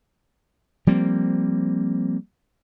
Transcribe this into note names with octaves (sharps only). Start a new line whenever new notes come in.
F3 G3 A#3 C4